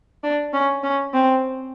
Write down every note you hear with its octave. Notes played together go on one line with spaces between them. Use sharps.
D4
C#4
C#4
C4